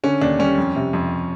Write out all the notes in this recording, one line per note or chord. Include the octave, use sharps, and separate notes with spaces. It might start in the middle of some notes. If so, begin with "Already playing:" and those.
D3 C#4
D#2 D4
G3 C#4
F2
C3
F2